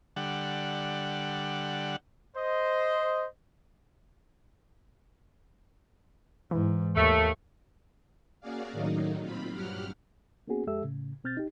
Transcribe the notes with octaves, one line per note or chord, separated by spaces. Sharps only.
D3 G3 F#5
C5 D#5
G#2 E3
D#2 A3
A#3 C#4 F#4 G#4 D5 F5
A2 D#3 F#3 D#4
A#2 C4 F4 B5
G2 F#3 G4 F#5 F6
A#3 B3 C#4 F#4 G#4
F2 G#3 G4 A4 E5 E6
A2 C#3
B2 C4 F6 G6 A6
D#4 G4